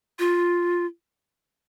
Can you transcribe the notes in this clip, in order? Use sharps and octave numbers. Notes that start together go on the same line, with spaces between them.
F4